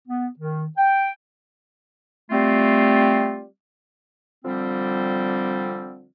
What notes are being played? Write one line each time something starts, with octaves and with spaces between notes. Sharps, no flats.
B3
D#3
G5
G3 A3 C4 F4
D3 F3 G3 C4